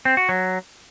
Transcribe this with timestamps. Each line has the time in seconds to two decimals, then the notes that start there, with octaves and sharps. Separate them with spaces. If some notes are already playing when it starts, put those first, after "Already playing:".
0.05 C4
0.17 F#4
0.29 F#3